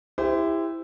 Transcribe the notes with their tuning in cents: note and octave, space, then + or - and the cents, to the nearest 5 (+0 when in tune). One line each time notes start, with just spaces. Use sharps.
E4 +0 G4 +25 C5 -25